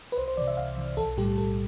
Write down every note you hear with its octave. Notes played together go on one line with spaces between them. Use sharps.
B4
C2 C5
C5
C3 E3 D5
E5
C2 F5
C3 E3
B1 A4
A2 G3 G4
B1 A4